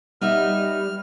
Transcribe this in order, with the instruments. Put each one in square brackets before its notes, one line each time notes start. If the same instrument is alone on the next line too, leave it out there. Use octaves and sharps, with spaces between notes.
[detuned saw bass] G3 [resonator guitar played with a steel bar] B3 D#4 E5 [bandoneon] F6